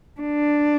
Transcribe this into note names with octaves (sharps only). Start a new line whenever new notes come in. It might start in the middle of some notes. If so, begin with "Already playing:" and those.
D4